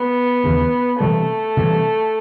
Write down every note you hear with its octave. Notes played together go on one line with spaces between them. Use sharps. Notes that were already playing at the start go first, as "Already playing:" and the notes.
Already playing: B3
D#2 C#3 E3
C3 E3 G3 A3
C3 E3 G3